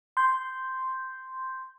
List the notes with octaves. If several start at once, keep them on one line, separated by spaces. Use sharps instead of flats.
C6 G6